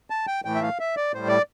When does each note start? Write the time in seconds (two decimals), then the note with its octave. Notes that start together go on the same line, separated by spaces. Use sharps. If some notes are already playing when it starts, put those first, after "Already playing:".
0.10 A5
0.27 G5
0.45 A2 E3 A3 G5
0.55 E5
0.62 F5
0.80 E5
0.97 D5
1.13 A2 G3 C5
1.28 D5